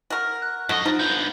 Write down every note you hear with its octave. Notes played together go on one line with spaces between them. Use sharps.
F#4 A#4
F#6
F#2 D3 F#4 D#5
F3 D#4
D3 B3 G6